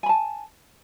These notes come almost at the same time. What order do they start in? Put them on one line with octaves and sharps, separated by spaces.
G#5 B5 A5